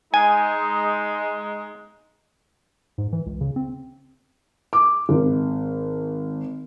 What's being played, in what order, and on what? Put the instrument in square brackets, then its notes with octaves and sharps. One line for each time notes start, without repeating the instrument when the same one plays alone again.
[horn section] G#3 D#4 [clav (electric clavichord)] G#5
[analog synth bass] G#2
E3
C#2
C#3
C4
[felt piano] D6
G#1